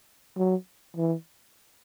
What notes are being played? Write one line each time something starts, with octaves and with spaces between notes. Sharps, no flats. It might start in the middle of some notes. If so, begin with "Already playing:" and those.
F#3
E3